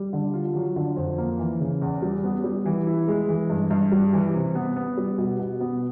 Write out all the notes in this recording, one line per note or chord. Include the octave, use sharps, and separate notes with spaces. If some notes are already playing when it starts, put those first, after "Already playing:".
Already playing: G3
D3
F4
F#3
D3
F2
A#3
E3
C#3
E2
G3
B3
G3
E3
E4
G#3
E3
G2
G2
G3
E3
C3
B3
B3
G3
B2
B2
B3